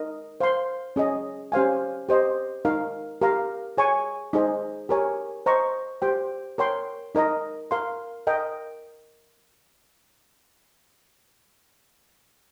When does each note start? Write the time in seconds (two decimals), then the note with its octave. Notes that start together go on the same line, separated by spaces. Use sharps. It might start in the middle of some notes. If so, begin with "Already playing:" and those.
Already playing: D#4 A#4 D#5
0.40 C5 F5 C6
0.96 C#4 G#4 D#5
1.52 C#4 G4 C5 F5 G#5
2.09 G4 C5 D#5
2.65 D#4 A#4 F5
3.21 G4 A#4 F5 A#5
3.77 G#4 C#5 G#5 C#6
4.33 D#4 G#4 C5 D#5
4.89 G4 A#4 C#5 G#5
5.46 C5 D#5 A#5 C#6
6.02 G4 C5 G5
6.58 A#4 C#5 G5 C6
7.15 D#4 A#4 D#5 A#5
7.71 A#4 F5 C6
8.27 A#4 D#5 G5